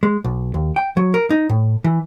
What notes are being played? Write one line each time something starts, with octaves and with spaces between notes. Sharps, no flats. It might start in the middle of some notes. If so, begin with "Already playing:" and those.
G#3
B1
D#2
G5
F#3
A#4
D#4
A2
E3